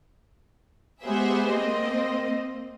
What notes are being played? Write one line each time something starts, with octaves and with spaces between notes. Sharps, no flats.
G#3 B3 G4 G#4 C5 E5
A#3 C4 D#5